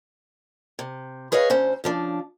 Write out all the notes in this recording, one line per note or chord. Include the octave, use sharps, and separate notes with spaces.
C3
G#4 B4 C#5 D#5 F5
D2 C#4 C5
C#3 F3 D4